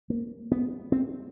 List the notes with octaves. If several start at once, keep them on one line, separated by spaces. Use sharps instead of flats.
A#3
B3
C4